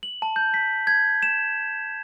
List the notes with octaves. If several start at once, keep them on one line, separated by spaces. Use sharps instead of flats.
F#7
A5
G6
B6
G#6
E7